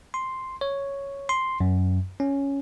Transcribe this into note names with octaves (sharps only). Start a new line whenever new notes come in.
C6
C#5
C6
F#2
C#4